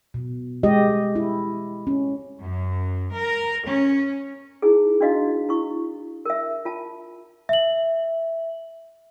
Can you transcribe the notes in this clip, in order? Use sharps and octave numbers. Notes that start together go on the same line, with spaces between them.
B2
G#3 G4 D#5
E4
C#4
F#2
A#4
C#4
D#4 E4 G#4
D4 E4 F#4 D#5 F5
E4 C#6
A#4 E5
F4 A5
E5 F#7